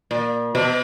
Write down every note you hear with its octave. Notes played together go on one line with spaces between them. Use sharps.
A#2
B2